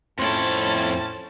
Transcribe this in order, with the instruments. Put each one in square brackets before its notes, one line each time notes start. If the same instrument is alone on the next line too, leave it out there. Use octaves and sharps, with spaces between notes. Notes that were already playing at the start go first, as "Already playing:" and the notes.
[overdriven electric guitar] F2 E4 [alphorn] A2 [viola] C#4 A5 [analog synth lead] C5